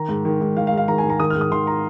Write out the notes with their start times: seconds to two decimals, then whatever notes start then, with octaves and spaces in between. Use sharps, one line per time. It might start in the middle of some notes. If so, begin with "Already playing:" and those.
Already playing: D#3 A#5
0.09 G#2
0.25 D#3
0.41 G#2
0.57 D#3 F5
0.67 F5
0.72 G#2
0.77 F5
0.88 D#3 A#5
0.98 G#5
1.04 G#2
1.10 A#5
1.20 D#3 D#6
1.30 F6
1.35 G#2
1.41 D#6
1.51 D#3 C6
1.67 A#5